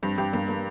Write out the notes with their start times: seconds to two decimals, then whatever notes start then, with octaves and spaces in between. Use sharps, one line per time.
0.02 G2 C4
0.18 G2 G4
0.33 G2 A#3
0.49 A#3